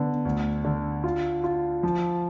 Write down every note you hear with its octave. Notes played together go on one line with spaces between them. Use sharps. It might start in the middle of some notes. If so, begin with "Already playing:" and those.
Already playing: D3 B3
D2
D3
F4
F4
F3